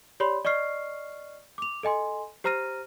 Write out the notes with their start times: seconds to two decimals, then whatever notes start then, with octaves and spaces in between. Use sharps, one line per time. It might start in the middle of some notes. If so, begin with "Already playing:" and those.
0.20 G4 C#5 D5 B5 C6
0.45 D5 D#5 C#6 F6 C7
1.58 D6 F7
1.83 A4 D#5 G#5 C6
2.44 G4 C5 A#5 F6 A#6 D#7